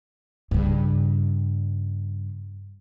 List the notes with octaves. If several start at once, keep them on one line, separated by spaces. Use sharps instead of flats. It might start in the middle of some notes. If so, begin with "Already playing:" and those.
G2 C#3